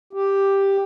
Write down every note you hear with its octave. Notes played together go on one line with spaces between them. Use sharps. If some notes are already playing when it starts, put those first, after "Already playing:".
G4